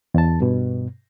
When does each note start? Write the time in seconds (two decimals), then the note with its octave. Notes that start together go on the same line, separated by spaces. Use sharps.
0.14 E2 A5
0.40 G2 B2